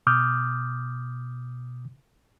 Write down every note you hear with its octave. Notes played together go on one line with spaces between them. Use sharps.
B2 D6 D#6 F6 G6